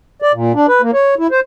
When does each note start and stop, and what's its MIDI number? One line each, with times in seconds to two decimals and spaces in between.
0.22 0.32 74
0.34 0.52 46
0.54 0.66 62
0.68 0.82 71
0.82 0.91 58
0.94 1.15 73
1.19 1.27 64
1.31 1.40 72